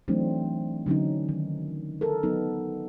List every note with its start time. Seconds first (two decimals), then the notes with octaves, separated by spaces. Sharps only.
0.08 E3 F#3 A3 C4 D4 D#4
0.86 D3 F#3 C#4 D#4
1.29 D#3
2.01 A4 A#4
2.23 F#3 B3 D#4